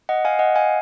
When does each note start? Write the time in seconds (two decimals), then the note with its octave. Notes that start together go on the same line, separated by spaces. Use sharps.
0.09 D#5 F#5
0.25 F5 G#5
0.39 D#5 F#5
0.55 F5 G#5